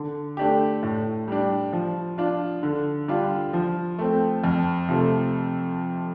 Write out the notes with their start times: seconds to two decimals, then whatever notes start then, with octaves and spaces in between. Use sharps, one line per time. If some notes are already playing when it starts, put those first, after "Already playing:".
Already playing: D3
0.37 A3 D4 G4
0.83 A2
1.28 G3 D4
1.73 F3
2.18 D4 F4
2.63 D3
3.08 G3 D4 F4
3.53 F3
3.99 A3 C4
4.44 F2
4.89 C3 F3 A3